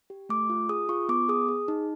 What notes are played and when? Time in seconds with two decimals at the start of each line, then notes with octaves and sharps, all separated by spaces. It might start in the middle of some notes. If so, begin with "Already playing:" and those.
0.10 G4
0.29 A3 D6
0.50 F4
0.69 G#4 D#6
0.89 F4 C#6
1.09 B3 D6
1.29 G#4 D#6
1.48 G#4
1.68 D#4